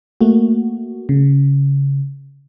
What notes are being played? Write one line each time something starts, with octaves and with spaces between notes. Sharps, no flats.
A3 A#3 F#4
C#3